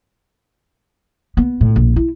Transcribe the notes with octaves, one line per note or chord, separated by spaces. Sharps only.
B3
A2
A#1
E4